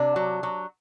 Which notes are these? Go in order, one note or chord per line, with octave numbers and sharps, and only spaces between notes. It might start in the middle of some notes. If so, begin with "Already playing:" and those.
Already playing: C3 D4
F#3
F#3